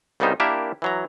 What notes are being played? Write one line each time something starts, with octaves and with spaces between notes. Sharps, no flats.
C2 C#3 G3 B3 D#4 C5
A#3 D4 E4 G4 A#4 E5
E3 F#3 A#5